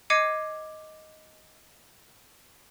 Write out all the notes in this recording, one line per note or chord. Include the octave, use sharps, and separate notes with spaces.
D#5 D6 G#6 C7 C#7 D#7